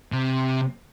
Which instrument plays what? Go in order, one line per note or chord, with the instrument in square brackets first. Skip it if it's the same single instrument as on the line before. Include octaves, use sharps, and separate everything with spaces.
[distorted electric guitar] C3